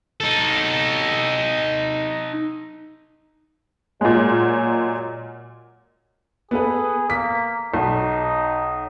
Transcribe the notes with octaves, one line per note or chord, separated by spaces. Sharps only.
D#4 A4
A#2 F#3 G#3
B3 G#4 A4 B4
A#3 B6
B1 D#4